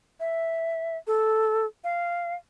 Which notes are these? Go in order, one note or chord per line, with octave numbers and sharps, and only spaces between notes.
E5
A4
F5